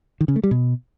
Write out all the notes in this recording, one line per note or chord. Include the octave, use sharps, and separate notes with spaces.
D#3
C#3
A3
G3
B2